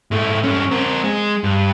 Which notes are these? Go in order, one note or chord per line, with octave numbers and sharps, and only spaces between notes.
G#2 A3
G2 C#4
C4 A#4
G#3
G2